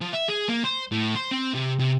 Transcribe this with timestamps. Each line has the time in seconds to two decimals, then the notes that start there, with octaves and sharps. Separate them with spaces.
0.01 F3
0.14 E5
0.29 G#4
0.48 A#3
0.64 C5
0.92 A2
1.15 C5
1.31 C4
1.54 C3
1.79 C3